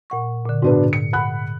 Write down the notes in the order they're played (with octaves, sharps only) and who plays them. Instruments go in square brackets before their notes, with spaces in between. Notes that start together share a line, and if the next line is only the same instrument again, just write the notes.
[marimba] A#2 F#5 C#6
A#2 D3
[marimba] G#2 [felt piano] B2 D4 B4
[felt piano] C#7
F#5 B5 F#6